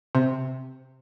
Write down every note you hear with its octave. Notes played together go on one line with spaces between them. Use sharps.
C3